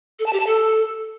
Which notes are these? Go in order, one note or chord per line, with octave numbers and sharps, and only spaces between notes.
A4
A5
G4
A5
A4